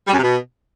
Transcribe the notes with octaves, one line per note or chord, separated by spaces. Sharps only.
G3
F#2
C3
B2